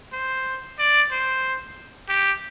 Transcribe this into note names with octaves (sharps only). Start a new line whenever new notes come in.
C5
D5
C5
G4